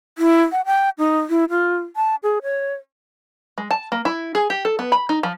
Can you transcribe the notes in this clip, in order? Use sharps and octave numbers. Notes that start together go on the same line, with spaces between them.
E4
F#5
G5
D#4
E4
F4
A5
G#4
C#5
G#3
A5
A#3
E4
G#4
G4
A4
B3
B5
D#4
F3